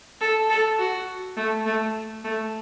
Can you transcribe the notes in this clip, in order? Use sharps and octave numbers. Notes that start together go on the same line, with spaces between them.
A4
A4
F#4
A3
A3
A3